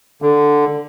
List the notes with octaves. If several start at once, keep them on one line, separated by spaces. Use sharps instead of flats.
D3